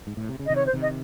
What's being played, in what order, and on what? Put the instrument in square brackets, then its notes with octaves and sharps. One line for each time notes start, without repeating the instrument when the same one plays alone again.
[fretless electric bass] G#2
A2
C3
C#3
[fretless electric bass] C3 D#3 [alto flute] D#5
[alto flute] C#5
C5
[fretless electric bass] C3 D#3
[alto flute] D#5